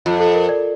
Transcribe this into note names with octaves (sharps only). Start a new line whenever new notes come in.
F2 F4
A4
A#4
D5